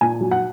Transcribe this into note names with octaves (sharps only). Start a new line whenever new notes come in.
A#2 G#5
F#3
F#5